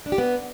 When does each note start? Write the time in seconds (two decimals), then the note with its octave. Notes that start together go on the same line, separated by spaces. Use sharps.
0.06 D4
0.12 G4
0.18 B3